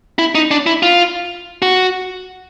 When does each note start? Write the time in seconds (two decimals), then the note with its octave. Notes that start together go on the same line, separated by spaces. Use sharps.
0.19 E4
0.35 D#4
0.51 D4
0.66 E4
0.83 F4
1.62 F#4